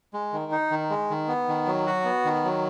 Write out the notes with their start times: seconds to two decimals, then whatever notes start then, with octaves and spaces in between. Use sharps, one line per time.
0.14 G#3
0.33 D#3
0.52 D#4
0.71 D#3
0.90 G#3
1.10 D#3
1.28 B3
1.48 D#3
1.67 F#3
1.86 F#4
2.05 B3
2.25 D#3
2.44 F#3